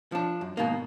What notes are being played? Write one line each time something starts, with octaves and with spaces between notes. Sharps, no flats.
F3 D4
F#2
G#2 B2 D#3 A#3